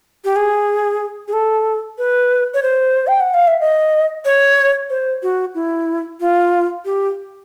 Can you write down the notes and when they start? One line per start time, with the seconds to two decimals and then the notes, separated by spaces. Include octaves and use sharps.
0.24 G4
0.36 G#4
1.28 G#4
1.33 A4
1.98 B4
2.54 C#5
2.63 C5
3.07 G5
3.20 F#5
3.34 F5
3.47 E5
3.60 D#5
4.25 C#5
4.90 C5
5.23 F#4
5.55 E4
6.20 F4
6.85 G4